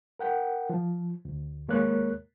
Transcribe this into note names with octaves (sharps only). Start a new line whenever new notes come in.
A#4 F#5 G5
F3
D2
D#2 G#3 A#3 A#4 C#5 F#6